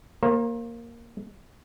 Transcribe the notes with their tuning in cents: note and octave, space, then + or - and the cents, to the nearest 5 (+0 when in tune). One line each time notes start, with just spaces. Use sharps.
A#3 +0 C5 +40 A#5 +15